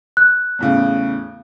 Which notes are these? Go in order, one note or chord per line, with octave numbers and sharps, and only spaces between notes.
F#6
E2 A2 C#3